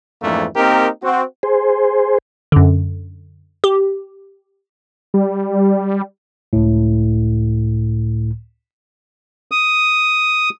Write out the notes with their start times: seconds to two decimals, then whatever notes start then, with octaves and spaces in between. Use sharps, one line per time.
0.22 F2 G#2 E3 A3 A#3 D4
0.55 A#3 C4 D#4 G4 A#4
1.03 C4 F#4
1.43 G#4 C5
2.52 F#2 D3
3.64 G4
5.14 G3
6.53 C#2 A2
9.51 D#6